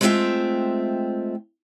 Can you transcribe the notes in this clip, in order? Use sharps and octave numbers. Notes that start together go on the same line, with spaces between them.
G#3 A3 C4 F4 E5 G5